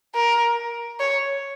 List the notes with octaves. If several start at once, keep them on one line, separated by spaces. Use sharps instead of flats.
A#4
C#5